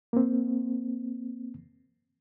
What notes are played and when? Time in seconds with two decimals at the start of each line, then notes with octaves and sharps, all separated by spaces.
0.13 A#3 C4